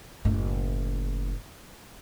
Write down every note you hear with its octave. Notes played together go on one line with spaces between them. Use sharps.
F#1 A2